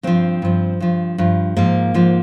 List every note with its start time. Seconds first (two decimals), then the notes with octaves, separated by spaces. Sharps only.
0.03 G2 F3 C4
0.42 G2 F3
0.80 G2 F3
1.18 G2 F3
1.56 G#2 F3 A#3
1.94 G#2 F3